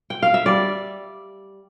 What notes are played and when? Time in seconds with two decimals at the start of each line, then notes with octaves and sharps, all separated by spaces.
0.10 G5
0.23 F5
0.34 E5
0.46 G3 D5